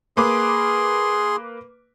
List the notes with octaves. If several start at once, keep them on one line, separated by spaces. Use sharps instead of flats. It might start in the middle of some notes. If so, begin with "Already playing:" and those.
A#3 G#4 B4 C6 D6